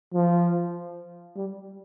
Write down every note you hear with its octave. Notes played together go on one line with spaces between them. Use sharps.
F3
G3